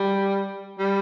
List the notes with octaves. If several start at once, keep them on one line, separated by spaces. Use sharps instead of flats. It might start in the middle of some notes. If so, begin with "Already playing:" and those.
Already playing: G3
G3